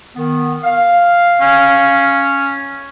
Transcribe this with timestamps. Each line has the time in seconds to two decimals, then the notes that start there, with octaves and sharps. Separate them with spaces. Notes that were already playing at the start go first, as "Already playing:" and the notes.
0.16 D#3 B3
0.64 F5
1.41 C#4